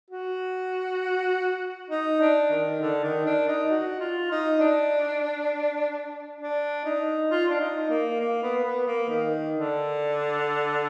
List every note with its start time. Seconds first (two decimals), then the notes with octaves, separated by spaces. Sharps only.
0.10 F#4
1.90 D#4
2.21 D4
2.50 D#3
2.81 D3
3.04 D#3
3.26 D4
3.48 D#4
3.70 F#4
4.00 F4
4.31 D#4
4.60 D4
6.41 D4
6.85 D#4
7.31 F4
7.49 D4
7.60 D#4
7.90 A#3
8.20 A#3
8.43 B3
8.65 B3
8.87 A#3
9.09 D#3
9.55 D3